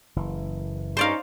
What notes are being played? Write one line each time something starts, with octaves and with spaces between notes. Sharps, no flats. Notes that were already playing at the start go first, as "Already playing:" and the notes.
F#1 E3
G2 C#4 D#4 C5 D5 F5 C#6